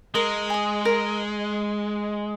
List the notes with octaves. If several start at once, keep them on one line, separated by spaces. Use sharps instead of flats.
G#3 A#4
D#5 G#5
A#4